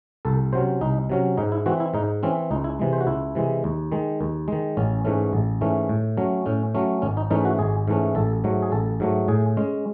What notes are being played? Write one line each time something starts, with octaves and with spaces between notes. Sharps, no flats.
C2 A4
C3 F#3 C#4 C5
C2 D#4
C3 F#3 C#4
G#2 D#4
E4
E3 C4 F#4
E4
G#2 D#4
E3 C4 C#4
C#2 D#4
E4
C3 E3 G#3
C5
F#4
C#2 E4
C3 E3 G#3
D#2
D#3 G#3
D#2
D#3 G#3
A1 C#4
G#2 E3 A3 C#4
A1
G#2 E3 A3 C#4
A2
F#3 A3 C#4
A2 C#4
F#3 A3 C#4
G#1 C#4
D#4
G#2 E3 A3 C#4 D#4
F#4
G#1 G#4
G#2 E3 A3 C#4
A1 A4
G#2 F#3 A3
G#4
A1 A4
G#2 F#3 A3
A2 G#4
G#3 C#4